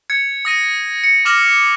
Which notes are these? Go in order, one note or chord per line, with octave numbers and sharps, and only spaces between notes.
G#6 C#7
D#6 A#6 D#7
C#7
D6 F6 A#6 E7 F#7